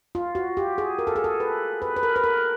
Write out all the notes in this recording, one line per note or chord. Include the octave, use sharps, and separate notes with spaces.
F4
F#4
G4
G#4
A#4
A4
G#4
A4
B4
B4
B4
A#4
B4
A#4